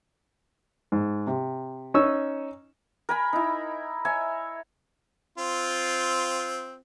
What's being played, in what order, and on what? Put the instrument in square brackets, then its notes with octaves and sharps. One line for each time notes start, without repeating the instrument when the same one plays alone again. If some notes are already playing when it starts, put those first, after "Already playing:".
[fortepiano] G#2
C3
C#4 D#4 C#6 E6
[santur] A#4 G#5 B5
D#4 E4
C#5 E5 G#5
[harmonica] C4 F4